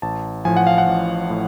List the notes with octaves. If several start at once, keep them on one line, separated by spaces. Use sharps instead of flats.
A1 A5
A2 F3 G#5
F#5
F5
F#5
A1
A2